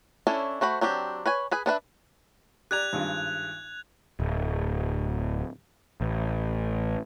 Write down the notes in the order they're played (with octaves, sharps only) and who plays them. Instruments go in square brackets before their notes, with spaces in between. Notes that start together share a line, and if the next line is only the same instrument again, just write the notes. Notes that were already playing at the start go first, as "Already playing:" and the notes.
[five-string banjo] C#4 D4 E4 A4 C#5
A3 F#4 C5 B5
F#3 C4 D4 G4
B4 C#5 G#5
G#4 B4 G#5
B3 D4 B4 E5
[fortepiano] G4 D5 A#5 [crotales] F#6 G#6 F7
[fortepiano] G#1 G2 F4
[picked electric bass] D1
A1